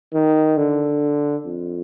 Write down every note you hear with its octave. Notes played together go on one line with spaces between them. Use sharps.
D#3
D3
F2